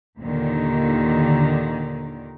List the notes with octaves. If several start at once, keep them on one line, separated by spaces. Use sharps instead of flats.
D#2 A#2 D3 D#3